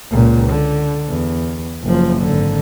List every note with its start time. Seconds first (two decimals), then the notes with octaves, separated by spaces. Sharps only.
0.11 C#2 A#2
0.50 D3
1.09 E2
1.84 F#1 F3
2.22 G#1 D3